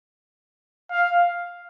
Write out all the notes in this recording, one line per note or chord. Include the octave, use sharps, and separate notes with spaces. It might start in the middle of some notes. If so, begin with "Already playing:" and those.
F5